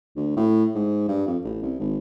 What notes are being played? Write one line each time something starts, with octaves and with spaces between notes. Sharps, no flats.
D2
A2
G#2
G2
F2
A1
C2
G#1